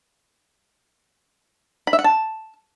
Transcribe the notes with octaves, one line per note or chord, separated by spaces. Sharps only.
B5
E5
F#5
A5